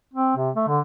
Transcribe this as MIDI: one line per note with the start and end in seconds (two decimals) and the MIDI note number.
0.14 0.34 60
0.37 0.50 48
0.56 0.66 57
0.68 0.80 50